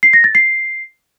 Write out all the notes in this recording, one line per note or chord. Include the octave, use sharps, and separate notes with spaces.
C7
A#6
A6
C7